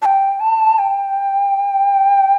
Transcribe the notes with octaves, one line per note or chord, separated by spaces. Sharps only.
A5
G5
A5
G5